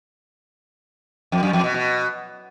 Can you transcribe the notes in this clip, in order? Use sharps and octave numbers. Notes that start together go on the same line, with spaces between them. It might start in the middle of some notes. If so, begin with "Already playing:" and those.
F2
F#2
F2
B2
B2